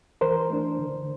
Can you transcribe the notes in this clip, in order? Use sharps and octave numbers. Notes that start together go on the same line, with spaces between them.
E3 A#4 C5
A3 D4
D3